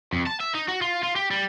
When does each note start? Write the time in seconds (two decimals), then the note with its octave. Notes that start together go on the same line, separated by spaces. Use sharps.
0.13 F2
0.26 A5
0.40 E5
0.55 D#4
0.68 F#4
0.82 F4
1.03 F4
1.16 G4
1.31 G3